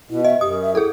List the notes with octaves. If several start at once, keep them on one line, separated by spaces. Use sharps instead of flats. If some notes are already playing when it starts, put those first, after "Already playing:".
B2 E4
D#5 E5
F#2 G4 D#6
E5
E4 G#4 A4